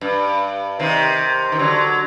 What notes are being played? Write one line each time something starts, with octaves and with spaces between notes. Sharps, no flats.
G2
C3 D#3
D#3
D3 F#3